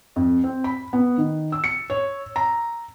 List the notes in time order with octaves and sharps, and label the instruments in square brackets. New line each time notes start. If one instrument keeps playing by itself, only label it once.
[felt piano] F2
C4
B5
B3
D#3
E6
C#7
C#5
A#5